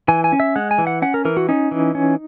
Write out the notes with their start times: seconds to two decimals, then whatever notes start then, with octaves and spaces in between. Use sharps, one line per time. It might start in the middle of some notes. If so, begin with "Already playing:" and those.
0.08 E3 G#5
0.24 G#5
0.32 C#4
0.40 E5
0.56 G#3 F#5
0.71 G#5
0.78 E3
0.87 F#5
1.02 C#4 F#5
1.14 A#4
1.25 E3 A#4
1.37 F#4
1.49 C#4 D#4
1.71 E3
1.95 C#4